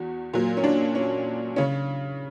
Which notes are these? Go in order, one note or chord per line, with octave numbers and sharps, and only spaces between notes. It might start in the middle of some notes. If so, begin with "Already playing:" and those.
Already playing: E2 F#4
A#2 F#3
C#4
D4
C#4
C#3 C#4